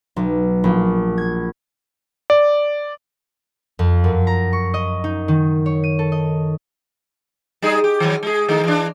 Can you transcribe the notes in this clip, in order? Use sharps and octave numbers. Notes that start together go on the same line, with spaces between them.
B1
A#1
G#6
D5
F2
F#2
A#5
C#6
D#5
D#4
D#3
C#5
D#7
A4
D#5
G3 D#4 G#4
G4
D#3 F#3
G#3 G#4
D#3 A3 D#4
E3 D4